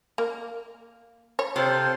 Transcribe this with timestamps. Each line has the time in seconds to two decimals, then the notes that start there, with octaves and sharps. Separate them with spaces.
0.18 A#3
1.39 C#5
1.56 C3 F4 A4 C5 C6